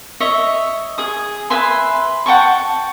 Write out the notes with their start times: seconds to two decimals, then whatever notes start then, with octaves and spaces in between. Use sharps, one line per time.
0.20 C#5 D#5 E5
0.98 G#4 D#6
1.50 B4 E5 G#5 C6
2.26 F#5 G5 A5 C#6